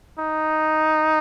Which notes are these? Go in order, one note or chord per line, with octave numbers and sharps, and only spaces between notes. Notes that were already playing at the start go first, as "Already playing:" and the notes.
D#4